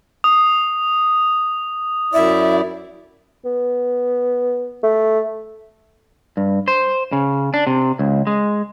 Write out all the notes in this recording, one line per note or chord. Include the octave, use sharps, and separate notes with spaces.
D#6
F#2 E4 D5 E5
B3
A3
G2
C5
C#3
D4
C3
C#2
G#3